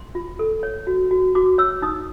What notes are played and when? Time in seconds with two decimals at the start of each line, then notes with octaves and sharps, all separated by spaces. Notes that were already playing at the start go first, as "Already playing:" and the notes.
Already playing: C6
0.15 F4
0.39 A4
0.63 C#5
0.87 F#4
1.11 F#4
1.35 F#4 D6
1.58 C#5 E6
1.82 D#4 D#6